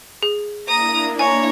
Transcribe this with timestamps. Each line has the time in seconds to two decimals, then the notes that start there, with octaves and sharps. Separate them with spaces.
0.23 G#4
0.68 A#3 D4 E4 A#5 D#6
1.19 C#5 G#5 A#5